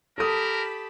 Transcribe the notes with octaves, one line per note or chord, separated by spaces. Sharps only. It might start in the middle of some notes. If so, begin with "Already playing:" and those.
G4 A4 A#4 A5 B5 D#6